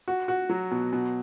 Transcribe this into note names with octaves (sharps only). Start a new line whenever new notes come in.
F#4
F#4
F#3
B2
B2